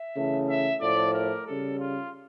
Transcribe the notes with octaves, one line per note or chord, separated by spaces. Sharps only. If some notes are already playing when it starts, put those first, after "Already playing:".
Already playing: E5
C#3 E3 A3
E5
A2 F3 A3 D5
A#4
C#3 G3 A4
F4